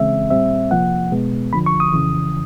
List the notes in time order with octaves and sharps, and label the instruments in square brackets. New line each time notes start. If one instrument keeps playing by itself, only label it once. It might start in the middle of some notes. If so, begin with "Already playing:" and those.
Already playing: [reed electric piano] C#3 E3 G#3 C4 E5
A#2 G3 C4 E5
C3 F3 A#3 F#5
B2 G#3 B3
F2 D3 F3 B5
C#6
D#6
F2 C#3 E3